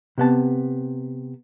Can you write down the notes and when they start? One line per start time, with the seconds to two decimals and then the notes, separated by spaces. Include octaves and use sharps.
0.18 C3 B3 A5